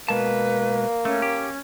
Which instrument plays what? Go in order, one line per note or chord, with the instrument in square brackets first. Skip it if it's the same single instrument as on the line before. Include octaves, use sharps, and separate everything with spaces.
[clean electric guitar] B2 G#3 A5 [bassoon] A#3 [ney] B4
[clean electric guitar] A3 [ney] C#4
[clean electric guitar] G4